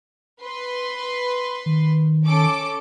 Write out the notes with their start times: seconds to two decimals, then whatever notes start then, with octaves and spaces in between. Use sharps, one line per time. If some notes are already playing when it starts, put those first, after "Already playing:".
0.41 B4 C6
1.66 D#3
2.24 C#4 A4 D6